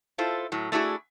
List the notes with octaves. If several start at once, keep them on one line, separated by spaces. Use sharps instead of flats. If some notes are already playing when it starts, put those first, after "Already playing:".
E4 F4 A4 C5
A2 F#3
A3 D4 E4 F#4 G#4